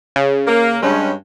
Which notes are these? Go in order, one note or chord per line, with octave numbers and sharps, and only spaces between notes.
C#3
A#3
G2 G#3 C#4